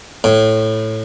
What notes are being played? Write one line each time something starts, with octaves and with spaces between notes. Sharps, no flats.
A2